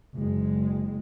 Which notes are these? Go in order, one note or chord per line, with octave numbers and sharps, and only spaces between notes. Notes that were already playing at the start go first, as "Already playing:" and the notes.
F#1 G#3